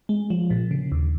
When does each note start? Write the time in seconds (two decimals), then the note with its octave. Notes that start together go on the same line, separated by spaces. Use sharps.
0.09 G#3
0.30 F3
0.50 A#2
0.71 C#3
0.92 D#2